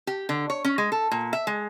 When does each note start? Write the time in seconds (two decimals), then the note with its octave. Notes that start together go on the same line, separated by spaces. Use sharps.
0.07 G4
0.29 D3
0.50 C#5
0.65 C#4
0.78 G#3
0.92 A4
1.11 A#2
1.33 E5
1.47 G#3